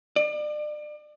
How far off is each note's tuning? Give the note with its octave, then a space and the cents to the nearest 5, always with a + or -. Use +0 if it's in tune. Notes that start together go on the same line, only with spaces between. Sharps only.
D5 +35